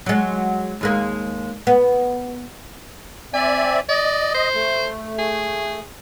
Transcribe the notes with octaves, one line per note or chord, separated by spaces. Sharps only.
F#3 G#3
D#2 G#3 A#3
B3
C4 D5 E5 G#5
D5 D#5
C5
A3
G#4